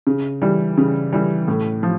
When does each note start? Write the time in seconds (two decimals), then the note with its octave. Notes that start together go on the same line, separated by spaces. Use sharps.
0.07 C#3
0.42 E3 G3
0.78 C#3
1.13 E3 G3
1.48 A2
1.83 F3